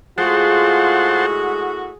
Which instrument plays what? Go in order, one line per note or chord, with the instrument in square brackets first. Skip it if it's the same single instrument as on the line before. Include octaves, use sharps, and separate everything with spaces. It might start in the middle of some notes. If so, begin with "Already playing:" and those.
[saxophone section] A2 F#4 [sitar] G#3 [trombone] F4 [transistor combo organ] C5 F#5 A5